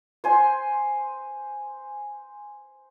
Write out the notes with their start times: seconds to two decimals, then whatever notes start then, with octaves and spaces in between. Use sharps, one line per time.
0.24 C5 G#5 C6